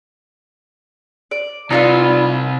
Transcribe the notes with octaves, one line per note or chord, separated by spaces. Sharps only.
D5
C3 D#4 F4 B4 D5